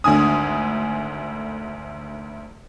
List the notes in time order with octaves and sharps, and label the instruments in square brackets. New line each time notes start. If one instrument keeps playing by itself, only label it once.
[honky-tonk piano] G#1 D2 D3 G#5 D#6